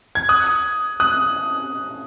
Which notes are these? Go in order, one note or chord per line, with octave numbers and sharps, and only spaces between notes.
G#6
D#6 F#6
D#6 F#6